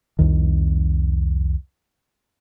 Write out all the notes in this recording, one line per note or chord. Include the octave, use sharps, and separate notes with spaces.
C2 F2 D#3